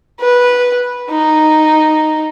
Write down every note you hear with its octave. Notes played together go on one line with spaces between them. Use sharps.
B4
D#4